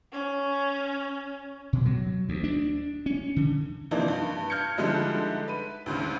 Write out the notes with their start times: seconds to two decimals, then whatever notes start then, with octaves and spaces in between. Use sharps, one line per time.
0.13 C#4
1.73 B2
1.86 F#3
2.29 D2
2.44 D4
3.06 C#4
3.36 D3
3.91 C3 E3 F3 A#3 D4 D#4
4.08 G2
4.50 F6 G6 G#6 C#7
4.77 D3 F3 G3 G#3 D#4 E4
5.48 B4 D#7
5.86 D2 G#2 C#3